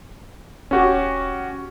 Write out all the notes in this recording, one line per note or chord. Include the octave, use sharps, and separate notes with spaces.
D#1 C#4 F#4 G4